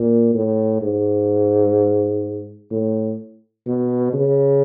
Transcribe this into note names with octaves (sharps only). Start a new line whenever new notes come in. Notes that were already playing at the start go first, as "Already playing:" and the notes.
Already playing: A#2
A2
G#2
A2
B2
C#3